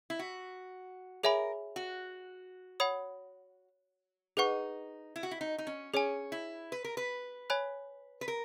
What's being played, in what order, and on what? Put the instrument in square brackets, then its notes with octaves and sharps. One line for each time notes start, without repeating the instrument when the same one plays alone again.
[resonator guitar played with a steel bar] E4
F#4
[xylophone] G#4 C#5 E5 G#5 B5 [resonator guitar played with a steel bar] A#4
[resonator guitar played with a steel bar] F#4
[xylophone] C#5 F#5 B5 D#6
[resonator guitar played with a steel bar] D#4 [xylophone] G#4 B4 F#5 C#6
[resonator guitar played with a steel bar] E4
F#4
E4
D#4
D#4
C#4
[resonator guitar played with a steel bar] C#4 [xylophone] G#4 C#5 G#5
[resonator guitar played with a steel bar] E4
B4
A#4
B4
[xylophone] C#5 G#5 B5 F#6
[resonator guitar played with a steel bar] B4
A#4